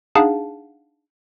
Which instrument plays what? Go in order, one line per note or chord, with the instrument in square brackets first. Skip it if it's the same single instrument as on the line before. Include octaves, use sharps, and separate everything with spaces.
[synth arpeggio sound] D4 D#4 G#4 F5 F#5 A5